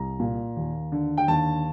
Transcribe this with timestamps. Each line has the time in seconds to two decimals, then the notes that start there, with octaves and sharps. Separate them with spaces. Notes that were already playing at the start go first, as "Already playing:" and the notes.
Already playing: C2 A#5
0.20 A#2
0.56 D#2
0.92 D3
1.18 G5
1.28 D#2 A5